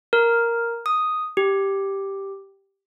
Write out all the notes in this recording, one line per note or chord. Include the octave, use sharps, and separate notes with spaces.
A#4
D#6
G4